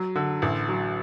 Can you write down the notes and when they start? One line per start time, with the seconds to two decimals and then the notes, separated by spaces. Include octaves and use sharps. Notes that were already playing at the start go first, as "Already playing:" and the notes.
Already playing: F#3
0.16 D3
0.42 A1
0.69 F#3